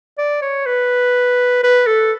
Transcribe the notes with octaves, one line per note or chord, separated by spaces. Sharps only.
D5
C#5
B4
B4
A4